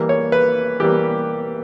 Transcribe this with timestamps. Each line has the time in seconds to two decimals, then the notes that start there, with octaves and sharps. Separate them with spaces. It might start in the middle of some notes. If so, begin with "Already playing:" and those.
Already playing: E3 G3 A#3
0.09 C#5
0.32 B4
0.80 E3 G3 A#3 G4